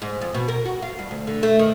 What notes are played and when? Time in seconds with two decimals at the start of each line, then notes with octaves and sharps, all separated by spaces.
0.02 G#2
0.22 F2
0.34 B2
0.48 A#4
0.65 F#4
0.82 F4
0.99 G2
1.11 D2
1.27 D3
1.43 A3
1.59 D#3